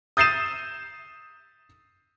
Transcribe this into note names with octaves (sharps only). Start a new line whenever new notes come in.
D#6 G6 A6 C7 D#7 E7